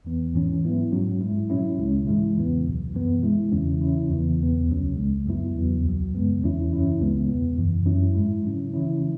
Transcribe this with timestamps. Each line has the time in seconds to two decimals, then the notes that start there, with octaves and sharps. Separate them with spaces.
0.05 E2 E3 B3
0.34 G#2 E3 C#4
0.63 G#2 F#3 B3 E4
0.92 G#2 F#3 C#4
1.21 G#2 G#3 E4
1.50 B2 F#3 C#4 E4
1.79 C#2 C#3 G#3 C#4
2.07 G#2 E3 G#3 E4
2.37 E2 C#3 E3 B3
2.65 C#2 B2 F#3
2.94 F#2 E3 B3
3.23 B2 G#3 E4
3.52 E2 C#3 E3 C#4 E4
3.81 C#3 E3 C#4 E4
4.10 E2 C#3 E3 B3
4.39 E2 B2 B3
4.69 C#2 C#3 F#3 C#4
4.96 C#2 C#3 G#3
5.26 F#2 F#3 B3 E4
5.55 E2 C#3 F#3 B3
5.84 C#2 B2 F#3
6.13 F#2 C#3 G#3 B3
6.42 E2 E3 C#4 E4
6.71 F#2 C#3 E3 C#4 E4
6.99 C#2 C#3 G#3 B3
7.29 E2 B2 B3
7.58 F#2 C#3 E3
7.86 F#2 F#3 C#4 E4
8.15 G#2 G#3 E4
8.44 C#3 F#3 C#4 E4
8.74 C#3 E3 C#4 E4